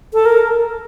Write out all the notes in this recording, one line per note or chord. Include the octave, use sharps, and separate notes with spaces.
A4
A#4